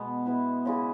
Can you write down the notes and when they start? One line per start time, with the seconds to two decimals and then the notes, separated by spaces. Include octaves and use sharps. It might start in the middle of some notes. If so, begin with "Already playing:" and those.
Already playing: B2 G#3 B3
0.25 B3 E4 B4 E5
0.65 C#3 G#3 E4 G#4